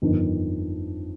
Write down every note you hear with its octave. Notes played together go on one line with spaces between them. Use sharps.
G1 F2 D#3